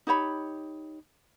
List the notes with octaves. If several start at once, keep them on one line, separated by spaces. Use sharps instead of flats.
D#4 G4 C#5 B5